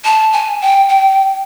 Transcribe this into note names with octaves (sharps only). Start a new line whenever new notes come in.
A5
G#5
G5
G5